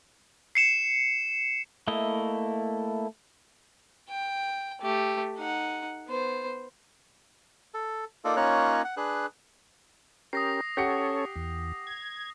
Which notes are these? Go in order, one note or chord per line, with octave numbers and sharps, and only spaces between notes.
C7 C#7 E7
A3 A#3 E4 D#5
G5
A3 G4
D#4 F#5
B3 C5
A4
A#3 D#4 F4 A4 D5
A#3 C#4 D#4 F4 C#5 F#6
F#5
D4 G#4 B4 F#6
C#4 G4 A#4 D#6 A#6 C7
C#4 G4 A4 C#5 F#5 C#7
E2
G#6